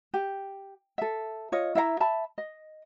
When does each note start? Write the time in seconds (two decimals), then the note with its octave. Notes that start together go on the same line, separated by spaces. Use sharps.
0.14 G4
0.98 A4 E5
1.52 F4 C#5 D#5
1.75 E4 E5 F5 A#5
2.00 E5 A5 B5
2.38 D#5